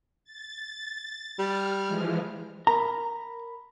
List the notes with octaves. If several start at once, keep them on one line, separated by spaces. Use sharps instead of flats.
A6
G3 F6
E3 F3 G#3
A#4 A#5 B5